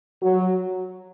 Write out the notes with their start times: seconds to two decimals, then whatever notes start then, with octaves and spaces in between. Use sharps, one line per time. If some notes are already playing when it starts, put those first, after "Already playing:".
0.22 F#3